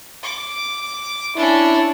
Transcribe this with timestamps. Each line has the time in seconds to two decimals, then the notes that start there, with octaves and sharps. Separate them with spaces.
0.23 D6
1.36 C#4 D4 E4